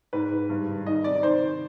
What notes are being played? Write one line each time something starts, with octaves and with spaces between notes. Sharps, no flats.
G#2 B4
G#2
G2
D#3
D#3 D#5
C3 D5
D#3 C5
D#3